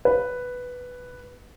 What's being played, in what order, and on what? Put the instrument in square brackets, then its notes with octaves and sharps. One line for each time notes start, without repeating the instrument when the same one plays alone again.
[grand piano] B4